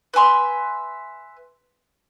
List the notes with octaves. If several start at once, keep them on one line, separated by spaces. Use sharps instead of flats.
B4 E5 G#5 C6